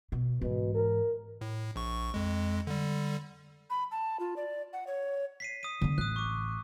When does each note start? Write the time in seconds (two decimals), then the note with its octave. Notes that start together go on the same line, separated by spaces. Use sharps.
0.12 B2
0.42 G#2 B2 E3
0.74 A#4
1.41 A2
1.76 A#1 C#6
2.14 F2 G#3
2.67 D3 G3
3.70 B5
3.91 A5
4.20 F4
4.36 D5
4.73 F#5
4.87 C#5
5.40 B6 C7 D#7
5.63 D#6 D#7
5.81 D3 B3
5.98 A1 D#6 F#6
6.16 C#6 D6